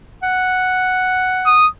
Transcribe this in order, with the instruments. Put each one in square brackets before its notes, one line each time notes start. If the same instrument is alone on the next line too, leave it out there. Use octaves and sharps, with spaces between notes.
[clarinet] F#5
[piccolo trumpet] D#6